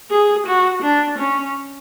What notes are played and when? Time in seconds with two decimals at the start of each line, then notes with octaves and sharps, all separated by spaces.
0.11 G#4
0.46 F#4
0.83 D4
1.18 C#4